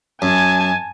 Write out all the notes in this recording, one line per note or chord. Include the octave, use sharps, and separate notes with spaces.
F#2 G#5 A5 G#6